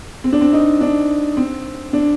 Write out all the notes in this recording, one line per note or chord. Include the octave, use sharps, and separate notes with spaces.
C4
D4
C4
D#4
D4
C4
D4